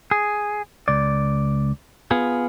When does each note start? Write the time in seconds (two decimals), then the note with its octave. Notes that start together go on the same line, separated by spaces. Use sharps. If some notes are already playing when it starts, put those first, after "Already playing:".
0.11 G#4
0.88 C#2 D5
2.11 B3 F4 G#4